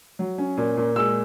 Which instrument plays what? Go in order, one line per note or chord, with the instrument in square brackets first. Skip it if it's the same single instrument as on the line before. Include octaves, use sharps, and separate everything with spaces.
[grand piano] F#3
C#4
A#2
A#2
G#3 E6